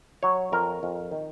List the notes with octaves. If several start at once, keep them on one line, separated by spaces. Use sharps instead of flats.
F#3 C#5
F2 A#4
F2
D#3